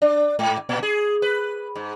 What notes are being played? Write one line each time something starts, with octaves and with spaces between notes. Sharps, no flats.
D4
G#2
A#2
G#4
B4
G#2